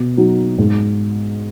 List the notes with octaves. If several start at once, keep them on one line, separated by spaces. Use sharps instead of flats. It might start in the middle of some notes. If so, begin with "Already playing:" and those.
Already playing: B2
F#3 D#4 F#4
G#2